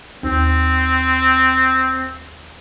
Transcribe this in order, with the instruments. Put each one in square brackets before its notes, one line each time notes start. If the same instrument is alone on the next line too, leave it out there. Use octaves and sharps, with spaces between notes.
[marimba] D#2 [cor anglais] C4